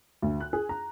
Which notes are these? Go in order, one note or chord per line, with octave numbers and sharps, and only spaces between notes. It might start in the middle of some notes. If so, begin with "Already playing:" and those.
D2
F#6
G#4
A#5